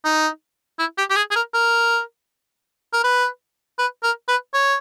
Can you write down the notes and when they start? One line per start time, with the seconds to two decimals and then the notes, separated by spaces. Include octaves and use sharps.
0.05 D#4
0.79 E4
0.98 G4
1.10 G4
1.16 G#4
1.31 G#4
1.36 A#4
1.54 A#4
2.93 A#4
3.04 B4
3.79 B4
4.03 A#4
4.28 B4
4.54 C#5